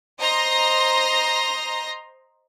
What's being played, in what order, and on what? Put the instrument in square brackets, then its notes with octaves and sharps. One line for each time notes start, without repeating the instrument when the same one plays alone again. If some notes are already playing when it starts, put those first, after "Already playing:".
[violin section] C5 D#5 A#5 C6 A#6